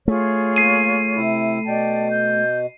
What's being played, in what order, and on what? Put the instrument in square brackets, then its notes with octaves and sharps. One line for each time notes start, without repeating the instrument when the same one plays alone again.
[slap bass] A3 [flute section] F4 G#4 C#5
[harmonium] A#3 [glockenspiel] C7 D#7
[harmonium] C3 E4
[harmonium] B2 [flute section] D5 G5 A5
[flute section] G6